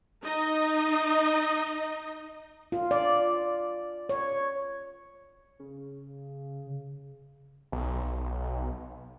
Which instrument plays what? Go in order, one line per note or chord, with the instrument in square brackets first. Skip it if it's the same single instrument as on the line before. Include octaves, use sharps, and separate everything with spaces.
[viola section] D#4 D#5
[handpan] F4
D5
C#5
[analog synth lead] C#3
[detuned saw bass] B1